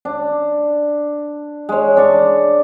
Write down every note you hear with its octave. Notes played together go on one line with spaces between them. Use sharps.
D4
G#3 C#5
D4 D5 C#6